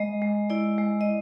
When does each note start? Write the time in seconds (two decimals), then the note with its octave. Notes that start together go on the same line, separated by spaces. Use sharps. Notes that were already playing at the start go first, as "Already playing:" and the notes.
Already playing: G#3 D#5
0.22 G#3
0.50 E4 D5
0.78 G#3
1.01 D#5